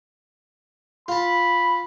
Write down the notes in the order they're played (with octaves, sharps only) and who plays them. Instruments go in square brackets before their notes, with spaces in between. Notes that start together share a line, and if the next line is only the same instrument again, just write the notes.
[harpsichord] F4 A5 [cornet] B5